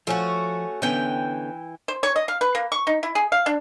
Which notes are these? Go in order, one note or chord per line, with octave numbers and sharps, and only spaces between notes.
F3 A3 C#4 F#4
D3 E3 B3 C#4 G5
C5
C#5
D#5
F5
B4
A#3
C#6
D#4
E4
G#4
F5
D4